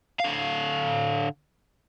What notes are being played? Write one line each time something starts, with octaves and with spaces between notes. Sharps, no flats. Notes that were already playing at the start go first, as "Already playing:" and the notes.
D3 F5